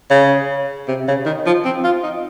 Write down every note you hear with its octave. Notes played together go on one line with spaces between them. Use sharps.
C#3
C3
C#3
D#3
F3
C4
F4
D#4